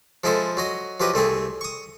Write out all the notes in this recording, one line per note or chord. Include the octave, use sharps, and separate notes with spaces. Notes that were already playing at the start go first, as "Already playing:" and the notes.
F3 G#3 E4 G#4 A4 C5
F#3 F#4 D#5
F3 F#3 G4 B4 D#5
C2 A3 C4 G#4
C#6 D#6